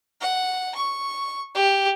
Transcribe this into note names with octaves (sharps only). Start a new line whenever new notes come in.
F#5
C#6
G4